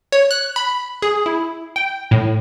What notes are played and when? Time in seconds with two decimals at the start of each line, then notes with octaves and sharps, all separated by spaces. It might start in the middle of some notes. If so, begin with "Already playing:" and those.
0.12 C#5
0.31 F#6
0.56 B5
1.02 G#4
1.26 E4
1.76 G5
2.11 A2